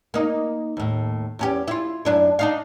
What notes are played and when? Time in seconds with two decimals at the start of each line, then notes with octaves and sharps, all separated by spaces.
0.14 A#3 D#4
0.77 D#2 A2
1.39 E2 C#4 G4
1.68 E4 F4
2.05 F#2 D4 E4
2.39 D4 D#4 F5